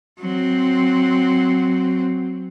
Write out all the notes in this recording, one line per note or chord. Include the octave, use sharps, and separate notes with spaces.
F#3 C4